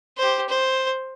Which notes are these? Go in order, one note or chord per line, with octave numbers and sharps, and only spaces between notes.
G4 C5
C5